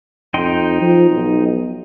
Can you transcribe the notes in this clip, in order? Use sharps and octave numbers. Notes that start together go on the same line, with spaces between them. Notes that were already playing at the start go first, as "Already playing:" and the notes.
F2 D#4 G5 C6
F3
B1